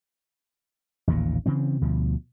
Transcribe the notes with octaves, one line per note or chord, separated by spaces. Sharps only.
A1 D#2 A#2 C#3
C#3 E3 C4
D2 B2 F3